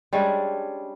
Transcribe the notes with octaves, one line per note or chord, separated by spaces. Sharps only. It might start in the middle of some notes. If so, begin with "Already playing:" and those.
G3 G#3 C#4 D4